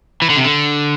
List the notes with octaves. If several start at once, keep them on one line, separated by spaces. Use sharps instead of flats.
E3
D3
C3
D3